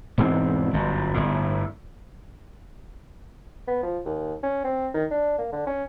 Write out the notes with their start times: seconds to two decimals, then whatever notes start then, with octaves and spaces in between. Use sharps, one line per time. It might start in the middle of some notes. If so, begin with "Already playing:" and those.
0.18 E1 G#2 E3 C4
0.73 G1 F#2
1.14 G1 A2
3.67 B3
3.83 F3
4.05 D#2
4.43 C#4
4.64 C4
4.94 D#3
5.11 D4
5.38 A#3
5.52 D3
5.67 C#4